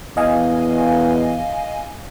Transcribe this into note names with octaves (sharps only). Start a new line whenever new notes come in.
E2 D#5 F5 G#5